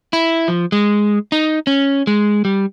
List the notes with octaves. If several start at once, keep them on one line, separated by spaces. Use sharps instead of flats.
E4
F3
G#3
D#4
C#4
G#3
G3